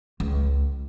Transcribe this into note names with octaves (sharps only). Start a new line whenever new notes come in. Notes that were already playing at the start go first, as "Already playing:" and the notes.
C#2